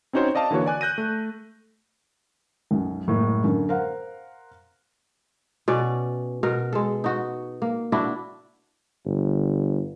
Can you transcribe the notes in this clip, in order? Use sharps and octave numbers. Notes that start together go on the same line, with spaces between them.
C4 C#4 D#4 F#4 C5 C#5
D5 D#5 F5 A5
D3 E3 A#3 F#4 C#5
D5 G#5 F#6
F#6 G6 A#6 D#7
A3
B1 F#2
F#1 A2 G#3 A#3
F#2 D3 A#4
A#4 C5 F5 F#5
B2 C#4 D5
B2 A#4
G#3 A4
D#4 F#4
A#3
D4 E4 F#4
G1